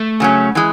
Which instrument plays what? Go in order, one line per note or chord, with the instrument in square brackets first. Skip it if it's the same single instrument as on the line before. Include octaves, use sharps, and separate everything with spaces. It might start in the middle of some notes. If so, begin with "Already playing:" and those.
Already playing: [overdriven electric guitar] A3
[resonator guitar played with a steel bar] C#3 F#3 C#4
E3 G#3